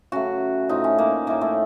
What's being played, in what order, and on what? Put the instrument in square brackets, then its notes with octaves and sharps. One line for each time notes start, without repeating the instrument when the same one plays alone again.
[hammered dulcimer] C#3 F#3 A3 F#4
A2 F3 A3 D#4
C#4
A#3
A2 A3 A#3
A3